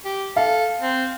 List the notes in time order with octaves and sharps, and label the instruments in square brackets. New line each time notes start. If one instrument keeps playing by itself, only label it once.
[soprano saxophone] G4
[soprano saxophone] A4 [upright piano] F5
[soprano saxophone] C4